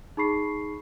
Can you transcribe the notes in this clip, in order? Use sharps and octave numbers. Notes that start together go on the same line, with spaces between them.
D#4 G#4 B5 C#6 C7